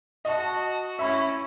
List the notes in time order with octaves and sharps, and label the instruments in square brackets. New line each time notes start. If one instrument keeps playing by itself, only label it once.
[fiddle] F#4 [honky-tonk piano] D#5 A5
[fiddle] C#4 E4 [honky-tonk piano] E5 B5 C#6